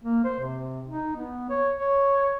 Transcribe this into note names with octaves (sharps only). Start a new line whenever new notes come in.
A#3
C5
C3
D#4
B3
C#5
C#5